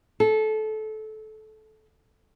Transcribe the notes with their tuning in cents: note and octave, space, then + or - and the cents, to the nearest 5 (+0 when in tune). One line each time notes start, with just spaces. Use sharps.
A4 -20